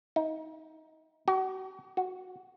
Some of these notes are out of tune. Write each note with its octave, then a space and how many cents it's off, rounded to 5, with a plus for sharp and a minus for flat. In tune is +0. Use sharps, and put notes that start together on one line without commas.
D#4 +25
F#4 +40
F#4 -5